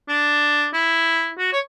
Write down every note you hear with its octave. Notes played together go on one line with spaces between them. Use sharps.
D4
E4
F#4
C#5